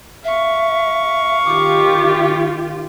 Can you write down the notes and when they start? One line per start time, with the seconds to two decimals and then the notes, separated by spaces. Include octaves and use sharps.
0.24 E5 F5 C#6
1.45 D#3 F4 G4 D6